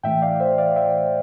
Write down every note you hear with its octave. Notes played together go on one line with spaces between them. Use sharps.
A2 E3 A3 E5 G5
D5 F5
C5 E5
D5 F5
E5 G5